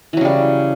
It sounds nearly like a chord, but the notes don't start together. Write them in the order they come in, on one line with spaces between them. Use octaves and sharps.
E3 F#3 C#3 G3